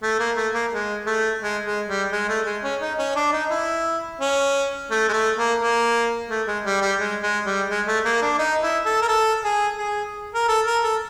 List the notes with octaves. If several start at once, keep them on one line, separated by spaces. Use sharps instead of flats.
A3
A#3
A3
A#3
G#3
A3
G#3
G#3
G3
G#3
A3
G#3
C#4
D#4
C#4
D4
D#4
E4
C#4
A3
G#3
A3
A#3
A#3
A3
G#3
G3
G3
G#3
G#3
G3
G#3
A3
A#3
D4
D#4
E4
A4
A#4
A4
G#4
G#4
A#4
A4
A#4
A4